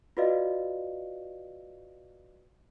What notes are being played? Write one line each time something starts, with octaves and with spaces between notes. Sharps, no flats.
F4 F#4 B4 D5 D#5 F5